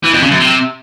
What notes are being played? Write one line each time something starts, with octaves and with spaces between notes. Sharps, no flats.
E3
F2
C#3
F#2
C3